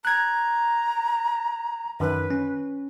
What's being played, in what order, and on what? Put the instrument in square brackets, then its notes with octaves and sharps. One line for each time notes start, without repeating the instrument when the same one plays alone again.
[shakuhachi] A#5 [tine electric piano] F#6 G#6
[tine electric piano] F#2 D#3 [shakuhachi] B4
[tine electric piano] C#4